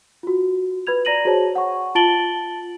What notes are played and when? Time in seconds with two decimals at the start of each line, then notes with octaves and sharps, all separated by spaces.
0.23 F4 F#4
0.87 B4 B5 G#6 F7
1.05 D5 A#5 A#6 D#7 F#7
1.25 F#4 G#4 C5 C#5 A5
1.56 F#5 C#6
1.95 F4 A5 A6 D7 F#7 G7